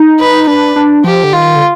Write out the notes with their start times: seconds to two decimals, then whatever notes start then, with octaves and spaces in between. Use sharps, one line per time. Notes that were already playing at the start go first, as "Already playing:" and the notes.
Already playing: D#4
0.19 B4
0.47 D4 B4
0.76 D4
1.04 F3 G4
1.24 D3
1.33 D#3 F4
1.56 D3